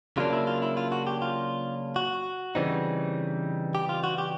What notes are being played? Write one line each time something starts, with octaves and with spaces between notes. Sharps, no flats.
C#3 F#3 A#3 D4 F4
E4
F4
E4
F4
F#4
G4
F4
F#4
C#3 E3 G3 C4 D#4
G4
F4
F#4
G4